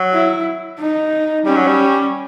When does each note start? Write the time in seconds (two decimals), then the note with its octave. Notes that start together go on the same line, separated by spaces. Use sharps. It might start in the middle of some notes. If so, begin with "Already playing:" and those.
Already playing: F#3
0.13 E4
0.79 D#4
1.45 G3 C#4
1.56 F#3
1.67 G3